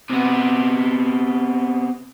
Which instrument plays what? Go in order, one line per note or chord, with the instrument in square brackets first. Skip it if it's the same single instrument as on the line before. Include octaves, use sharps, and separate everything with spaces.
[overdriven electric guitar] C3 B3